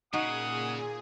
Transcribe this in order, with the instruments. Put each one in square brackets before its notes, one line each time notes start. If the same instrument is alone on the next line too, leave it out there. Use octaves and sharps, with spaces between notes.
[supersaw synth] A#2 G#4 [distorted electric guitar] C#3 [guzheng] D#4 F#4 G#5 [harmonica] F#5 D#6